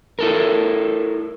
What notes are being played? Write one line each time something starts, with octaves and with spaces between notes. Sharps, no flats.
E4 A4 A#4